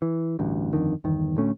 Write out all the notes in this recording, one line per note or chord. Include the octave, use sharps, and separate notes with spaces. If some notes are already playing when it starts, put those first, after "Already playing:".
E3
A1 D2 G2
G1 F2 D3 D#3
G1 E2 D#3
D2 A2 A3 C#4